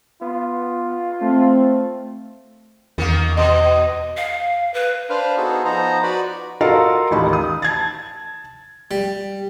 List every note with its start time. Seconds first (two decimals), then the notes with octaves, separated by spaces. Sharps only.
0.21 B3 F4
1.21 A3 C4
2.98 E2 D#3 A#3
3.37 B2 D#5
4.17 F5
4.74 B4
5.10 D4 B4 C5 F5
5.37 B3 D#4 F#4 G#4 A4
5.65 F3 B3 D#4 C5 A#5
6.03 F#4 B4 D5 B5
6.61 F4 F#4 A4 A#4 D#5 F5
7.11 A1 D#2 D#4 B5
7.33 D#6
7.62 A5 G#6 A6
8.91 G3